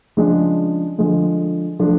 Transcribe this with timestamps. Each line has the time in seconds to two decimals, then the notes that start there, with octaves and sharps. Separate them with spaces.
0.17 C#3 F3 G#3 D4
0.98 D3 F3 G#3
1.79 F3 A3 D4